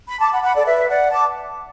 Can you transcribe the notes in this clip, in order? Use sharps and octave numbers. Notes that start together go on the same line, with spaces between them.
B5
A5 D6
F#5 B5
F#5 B5
A4 D5
B4 E5
D5 F#5
A5 D6